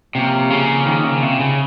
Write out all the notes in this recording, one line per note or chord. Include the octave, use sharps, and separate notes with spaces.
C3 F3 A#3 C#4 F4
C#3
D#3
C#3
C3
C#3